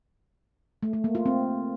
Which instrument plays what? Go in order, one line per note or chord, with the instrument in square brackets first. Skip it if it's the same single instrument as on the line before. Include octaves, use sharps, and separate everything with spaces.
[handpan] A3
A3
A#3
F4
C4